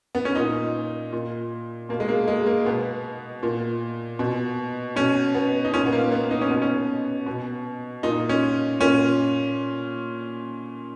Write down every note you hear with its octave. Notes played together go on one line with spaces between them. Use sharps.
B3
C#4
A#2 D#4
A#2
B2 A#3
G#3
A#3
G#3
A#3
B2 B3
A#2
B2
B2 C#4
B3
D#4
A#2 C#4
B3
A#3
B3
D#4
C#4
B2 B3
C#4
B2
A#2 D#4
C#4
A#2 C#4